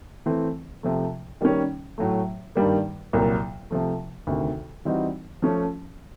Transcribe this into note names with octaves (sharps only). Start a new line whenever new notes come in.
E3 A3 C4
C3 F3 A3
D#3 G3 A#3 C#4
A2 F#3 A3
G2 D#3 G3 A#3
C2 A#2 F#3 A#3
C3 F3 A3
D2 C3 D#3
E3 G3 C4 D#4 F#4
F3 A3 C#4